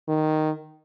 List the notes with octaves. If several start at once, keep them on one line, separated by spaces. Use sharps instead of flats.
D#3